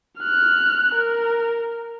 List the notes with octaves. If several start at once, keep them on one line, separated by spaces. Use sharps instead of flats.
F6 F#6
A#4